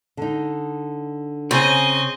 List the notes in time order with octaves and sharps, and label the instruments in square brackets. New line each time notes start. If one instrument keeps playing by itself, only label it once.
[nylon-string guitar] D3 D#4
[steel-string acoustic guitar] C#3 [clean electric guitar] C4 [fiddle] D#5 G#5